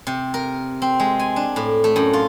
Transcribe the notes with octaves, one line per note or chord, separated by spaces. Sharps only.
C3
A#4
C4
G#3
G#5
D4
A2
A3
F#2
F4